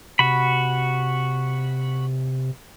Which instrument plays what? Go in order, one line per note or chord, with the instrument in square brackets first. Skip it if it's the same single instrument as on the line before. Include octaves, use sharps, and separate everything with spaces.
[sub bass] C3 [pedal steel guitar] F#4 B5